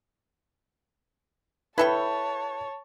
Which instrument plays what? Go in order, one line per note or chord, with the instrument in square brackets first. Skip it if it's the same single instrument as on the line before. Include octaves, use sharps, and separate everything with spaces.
[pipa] E4 A4 G5 [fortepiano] B4 [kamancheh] C#5 A5